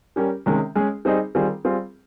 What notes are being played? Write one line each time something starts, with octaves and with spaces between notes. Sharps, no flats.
G3 C#4 G4 A#4
C3 D#3 G#3 C#4
G#3 C#4 G#4
G3 C4 D#4 G#4
D#3 G3 C4 F4 G#4
G3 C4 F4 G#4